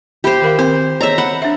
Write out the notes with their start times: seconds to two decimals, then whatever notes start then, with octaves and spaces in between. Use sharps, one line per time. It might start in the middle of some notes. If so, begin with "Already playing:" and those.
0.24 G4 C5 E5 B5
0.42 D#3 A#4 F5
0.59 C4 C5
1.01 G#4 C#5 D#5 E5 A#5
1.18 F#5 B5
1.42 D4 E5